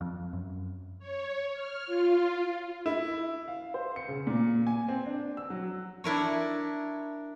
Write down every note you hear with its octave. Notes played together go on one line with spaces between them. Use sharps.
F2
F#2
C#5
F6
F4
E4
F5
C5
C#7
C#3
A#2
G#5
C4
D4
E6
F#3
D4 E4 A#4 C#5